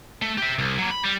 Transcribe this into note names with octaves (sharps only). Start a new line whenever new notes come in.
A3
G4 E5
C2
F#3 A#3
B5
G3